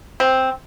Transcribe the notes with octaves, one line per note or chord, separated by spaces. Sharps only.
C4